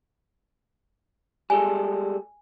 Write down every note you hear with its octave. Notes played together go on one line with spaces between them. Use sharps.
G3 G#3 A4 G#5